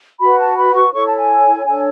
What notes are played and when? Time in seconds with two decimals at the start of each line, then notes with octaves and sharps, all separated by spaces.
0.20 F#4 B4 B5
0.38 A5
0.58 B5
0.75 C#6
0.94 E4 A4 C#5 C#6
1.06 A5
1.18 G#5
1.66 D4 A4 C#5 G#5